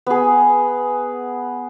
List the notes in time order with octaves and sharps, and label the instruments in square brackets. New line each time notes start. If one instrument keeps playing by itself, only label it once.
[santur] B3 G#4